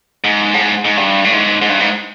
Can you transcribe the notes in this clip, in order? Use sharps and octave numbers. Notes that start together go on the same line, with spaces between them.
G#2
A2
G#2
G#2
G2
A2
G#2
G#2
G2
G#2